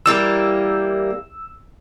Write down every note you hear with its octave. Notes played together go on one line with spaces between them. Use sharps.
E3 G3 A#3 E6